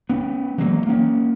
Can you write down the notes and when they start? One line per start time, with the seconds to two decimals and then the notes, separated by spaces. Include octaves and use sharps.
0.09 B3 C#4
0.58 E3 F#3 G#3 A#3
0.87 A#3 C#4